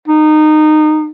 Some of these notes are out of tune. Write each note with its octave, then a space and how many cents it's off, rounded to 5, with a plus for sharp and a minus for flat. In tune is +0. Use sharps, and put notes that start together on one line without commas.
D#4 -20